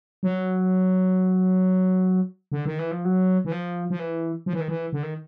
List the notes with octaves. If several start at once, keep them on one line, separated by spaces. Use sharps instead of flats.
F#3
D3
D#3
E3
F3
F#3
E3
F3
F3
E3
F3
E3
D#3
E3
D3
D#3